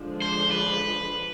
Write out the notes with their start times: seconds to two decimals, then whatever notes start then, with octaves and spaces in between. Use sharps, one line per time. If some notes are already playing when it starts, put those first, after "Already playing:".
Already playing: D3 F3 G#3 D4
0.22 C5
0.51 B4